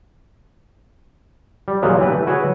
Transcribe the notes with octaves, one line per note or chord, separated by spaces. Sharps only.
G3
D#2 A#2 F3 F#3 G#3 B3
E3 D4 G4 B4
A3
E4 F#4 G#4 B4 C#5